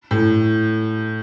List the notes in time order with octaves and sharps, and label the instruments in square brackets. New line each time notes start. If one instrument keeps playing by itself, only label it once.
[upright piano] A2